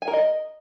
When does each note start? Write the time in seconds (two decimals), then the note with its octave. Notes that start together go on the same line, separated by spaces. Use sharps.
0.02 G#5
0.08 A#4
0.13 D#5